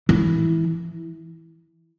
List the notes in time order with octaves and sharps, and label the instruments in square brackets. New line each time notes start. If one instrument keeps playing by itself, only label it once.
[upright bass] E3